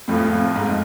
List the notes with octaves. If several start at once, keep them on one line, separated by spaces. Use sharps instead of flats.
F#1 F2 A2 F3 A3 F4
G#2